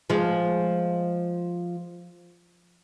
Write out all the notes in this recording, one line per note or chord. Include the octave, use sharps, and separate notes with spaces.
F3 G#3